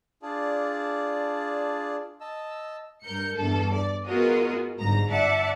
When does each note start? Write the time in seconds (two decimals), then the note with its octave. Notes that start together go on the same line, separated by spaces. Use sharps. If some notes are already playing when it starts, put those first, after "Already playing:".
0.22 D4 F4 G#4 D5 A5
2.21 D#5 A5 E6
3.03 G2 A#4 G6 C#7
3.35 E2 G2 A4
3.73 D5
4.06 B3 F4 F#4 G#4 A#4 D#5
4.79 G1 G#2 A#5 A#6
5.09 D5 E5 F#5 A5 D6